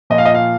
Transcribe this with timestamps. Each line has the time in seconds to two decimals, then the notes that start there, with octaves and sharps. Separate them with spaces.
0.10 A#2 F3 D#5
0.18 F5
0.25 D#5
0.34 F5